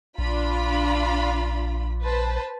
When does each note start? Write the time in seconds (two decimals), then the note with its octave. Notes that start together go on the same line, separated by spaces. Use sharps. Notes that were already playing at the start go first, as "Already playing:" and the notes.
0.18 A#1 D4 F4 B5
2.03 B4 C5 A5